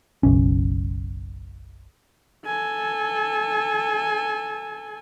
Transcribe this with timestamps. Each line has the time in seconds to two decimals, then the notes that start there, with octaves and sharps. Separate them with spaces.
0.23 F#1 B1 C#4
2.46 A4 G#5